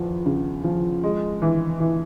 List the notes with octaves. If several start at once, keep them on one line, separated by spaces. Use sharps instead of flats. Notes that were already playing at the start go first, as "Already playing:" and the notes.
Already playing: E2 F3
C#3
F3
G#3
E3
E3